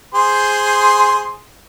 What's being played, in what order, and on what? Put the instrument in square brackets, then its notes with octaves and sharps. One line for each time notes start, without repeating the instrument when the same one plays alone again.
[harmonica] G#4 C5 C6